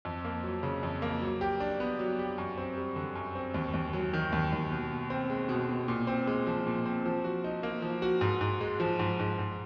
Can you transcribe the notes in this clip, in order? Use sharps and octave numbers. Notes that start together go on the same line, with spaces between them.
F2
A#3
F#3
C#3
F2
A#3
F#3
G4
D4
B3
F#3
G4
F#2
C4
G3
D3
F#2
C4
D#2
D#2
F#3
D#3
D#2
D#2
B2
B2
C4
G#3
B2
B2
A#2
C4
G#3
F3
A#2
C4
F3
F#4
D#4
A#3
F3
F#4
G#2
G#2
G#3
F3
G#2
G#2
G#2